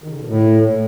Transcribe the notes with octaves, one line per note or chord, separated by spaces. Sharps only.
D#3
C#3
D3
B2
A2